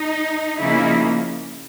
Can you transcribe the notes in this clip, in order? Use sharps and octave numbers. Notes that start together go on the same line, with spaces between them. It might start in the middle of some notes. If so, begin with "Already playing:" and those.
Already playing: D#4
C#3 F3 A#3 D#4 E4